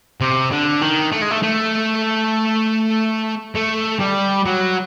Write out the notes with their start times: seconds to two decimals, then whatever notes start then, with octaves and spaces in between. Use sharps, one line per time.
0.21 C3
0.51 D3
0.81 D#3
1.12 A3
1.22 G#3
1.31 A3
1.43 A3
3.55 A3
4.00 G3
4.45 F#3